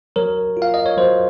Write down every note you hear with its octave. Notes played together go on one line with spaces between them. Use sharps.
F#3 A#4 C#5
F4
F5
D#5
C#5
F#3 C5